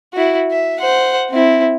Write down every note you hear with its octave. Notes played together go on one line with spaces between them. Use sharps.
E4 F#4
E5
C5 F#5
C4 E4